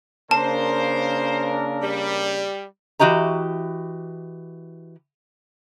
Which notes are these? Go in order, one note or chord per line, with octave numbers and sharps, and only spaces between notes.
C#3 A#3 D4 A#4 C5 A5
G3
E3 F#4 G4 D#5 A#5